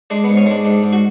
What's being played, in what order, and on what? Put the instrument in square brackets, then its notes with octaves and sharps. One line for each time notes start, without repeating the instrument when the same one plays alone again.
[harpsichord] G#3 D4
G#2 B3
C#4
G#3 D4
G#2 D4
G#2
F#4